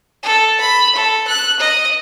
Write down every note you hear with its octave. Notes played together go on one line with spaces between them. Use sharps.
A4
B5
A4
F#6
D#5